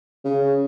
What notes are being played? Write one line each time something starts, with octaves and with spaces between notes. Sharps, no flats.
C#3